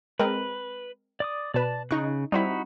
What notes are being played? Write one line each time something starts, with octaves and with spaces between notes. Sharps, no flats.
G#3 C4 A#4 B4
D5 D6 D#6
B2 B4 D5 A5
C#3 D#4 C#6 F#6
G3 C4 D#4 E4 F#4 B5